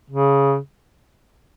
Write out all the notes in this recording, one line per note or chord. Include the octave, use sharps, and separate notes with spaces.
C#3